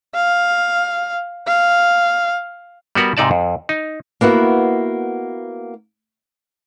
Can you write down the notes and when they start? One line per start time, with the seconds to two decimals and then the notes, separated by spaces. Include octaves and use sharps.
0.15 F5
1.47 F5
2.95 G3 B3 F#4 A#4
3.17 G#2 C3 D#4 D5 A5
3.31 F2
3.69 D#4
4.21 A#3 B3 E4 F#4